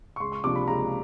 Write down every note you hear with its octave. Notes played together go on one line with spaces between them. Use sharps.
C#6
C#2 C6
C#6
C3 F3 A#3 D4 D6
B5
C#2 A#5